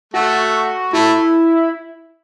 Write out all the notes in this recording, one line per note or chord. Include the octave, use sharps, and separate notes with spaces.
A3 F#4
A3 E4